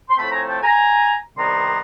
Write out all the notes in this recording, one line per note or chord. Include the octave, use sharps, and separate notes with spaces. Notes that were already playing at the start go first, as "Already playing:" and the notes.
C6
A2 F3 A3 C4 A5 B5
G#5 A#5
G5 A5
G#5 A#5
C2 C3 D#3 G3 B3 A#5 C6